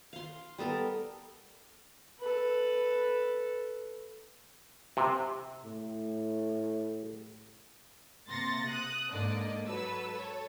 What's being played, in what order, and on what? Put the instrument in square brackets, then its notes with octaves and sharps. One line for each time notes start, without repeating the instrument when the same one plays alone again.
[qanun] F5 C6
G3 B3 A4 A#4
[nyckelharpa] A4 B4
[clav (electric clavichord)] C3
[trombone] A2
[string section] C3 A#3 C6 A6 A#6 C#7
D#6 F#6
G#2 D3 A#3 D5 D#5
F#3 A4 B4 E6
A4 C#5